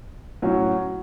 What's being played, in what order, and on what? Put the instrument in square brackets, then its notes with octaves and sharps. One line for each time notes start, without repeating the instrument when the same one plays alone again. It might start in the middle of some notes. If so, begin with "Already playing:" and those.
[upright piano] A2 F#3 C#4 F#4 C#5